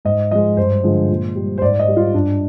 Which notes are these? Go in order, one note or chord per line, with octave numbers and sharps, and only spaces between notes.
G#2 D#5
F3 G#3 D#5
G2 C5
D3 F3 G#3
A#2
G3
C5
G#2 D5
D#5
G3
F4
G2 D4